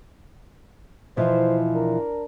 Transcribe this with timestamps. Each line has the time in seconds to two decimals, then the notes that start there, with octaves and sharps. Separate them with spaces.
1.17 B2 E3 F3 C5
1.74 D4 A#4